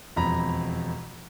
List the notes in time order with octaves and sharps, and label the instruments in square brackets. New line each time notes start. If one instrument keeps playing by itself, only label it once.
[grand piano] E1 F2 A#5 B5